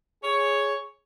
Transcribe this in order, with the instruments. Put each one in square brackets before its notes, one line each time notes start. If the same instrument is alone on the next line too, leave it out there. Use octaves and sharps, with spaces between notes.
[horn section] G#4 C#5